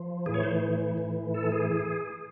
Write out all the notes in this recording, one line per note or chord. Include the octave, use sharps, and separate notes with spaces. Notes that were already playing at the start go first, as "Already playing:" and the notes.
Already playing: F3
A2 E3 G#4
C#5
C5
A2 E3
A4
G#4